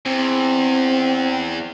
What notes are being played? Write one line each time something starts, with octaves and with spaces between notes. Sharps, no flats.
E2 C4